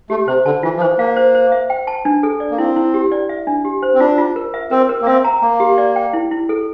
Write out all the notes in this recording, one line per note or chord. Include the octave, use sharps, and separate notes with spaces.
A3 G4
C3 C5
D3 A5
E3 F4
F3
E3 C5
A#3 F5
C5
C5
E5
G5
A5
D4
A4
D5
A#3
C4 E4
E4
G4
D5
E5
D4
G4
C5
C4
D4 F4
F4
A#4
E5
C4 A#4
A#4
A#3
C4 E5
A#5
A#3 A#5
G4
D5
G5
E4
E4
A4